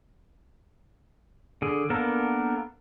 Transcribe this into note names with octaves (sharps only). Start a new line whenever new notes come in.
D3 G#4
A#3 B3 D4 A4 A#4